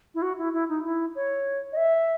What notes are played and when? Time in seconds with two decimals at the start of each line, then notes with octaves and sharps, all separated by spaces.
0.15 E4
0.22 F#4
0.38 E4
0.53 E4
0.69 D#4
0.84 E4
1.15 C#5
1.73 D#5
1.77 E5